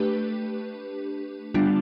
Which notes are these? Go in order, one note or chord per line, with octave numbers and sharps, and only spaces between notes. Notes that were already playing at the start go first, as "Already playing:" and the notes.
Already playing: A3 D4 G4 B4
D3 G3 B3 D4 F4